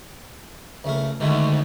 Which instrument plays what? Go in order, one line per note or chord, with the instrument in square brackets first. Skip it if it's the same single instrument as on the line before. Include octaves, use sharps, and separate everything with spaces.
[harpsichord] C#2 A3 A#4
[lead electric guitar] D2 [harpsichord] D#3 A3 F#4 [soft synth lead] G#3